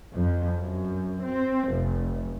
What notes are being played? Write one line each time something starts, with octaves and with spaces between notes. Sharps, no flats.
F2
F#2
C4
F1